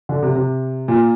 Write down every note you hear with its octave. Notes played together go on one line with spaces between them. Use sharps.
D3
C3
C3
A#2